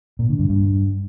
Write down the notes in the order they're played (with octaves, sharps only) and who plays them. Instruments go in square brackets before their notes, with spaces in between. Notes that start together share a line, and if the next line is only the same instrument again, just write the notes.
[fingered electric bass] A#2
D3
G2
G2